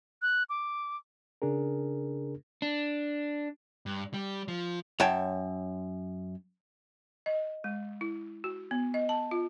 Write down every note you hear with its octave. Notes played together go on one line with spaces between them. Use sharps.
F#6
D6
C#3 D4 G#4 A#4
D4
G2
G3
F3
F#2 C#5 G5 A5
D#5
G#3
E4
F#4
B3
D#5
A5
F4